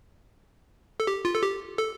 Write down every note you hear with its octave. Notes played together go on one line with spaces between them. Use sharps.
A4
G4
F4
A4
G4
A4